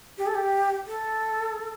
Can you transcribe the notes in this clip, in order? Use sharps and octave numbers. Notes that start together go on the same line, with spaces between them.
G4
A4
G4
A4